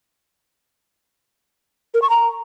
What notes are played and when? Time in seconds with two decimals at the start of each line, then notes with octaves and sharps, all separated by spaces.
1.94 A#4
2.02 C#6
2.10 A#5